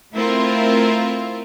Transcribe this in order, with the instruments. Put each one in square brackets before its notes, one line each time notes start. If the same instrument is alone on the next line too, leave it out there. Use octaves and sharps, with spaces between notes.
[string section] A3 C4 E4 F4 A#4